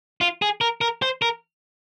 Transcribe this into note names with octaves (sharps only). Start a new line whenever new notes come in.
F4
G#4
A#4
A#4
C5
A#4